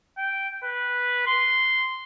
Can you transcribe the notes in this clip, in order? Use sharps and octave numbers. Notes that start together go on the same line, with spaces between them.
G5
B4
C6